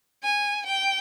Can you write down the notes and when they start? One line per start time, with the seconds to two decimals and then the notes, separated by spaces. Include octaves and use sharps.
0.23 G#5
0.66 G5